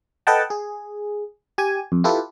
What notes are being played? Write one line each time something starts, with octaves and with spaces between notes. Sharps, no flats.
A4 B4 D#5 F#5 G5 A5
G#4
G4 G#5
F2
E4 F4 G4 A4 B4